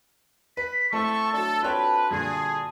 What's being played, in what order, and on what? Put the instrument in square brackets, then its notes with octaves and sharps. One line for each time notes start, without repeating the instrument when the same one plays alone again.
[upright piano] B4 [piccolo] B6
[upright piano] A3 C4 E4 [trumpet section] A4 C#6 [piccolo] A5
[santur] F#3 D4 [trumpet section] A4
[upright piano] C4 C#5 G5 [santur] F4 A4 A5 [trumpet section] B4 [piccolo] F#6
[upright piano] G2 A#2 D3 [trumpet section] G#4 [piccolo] G#6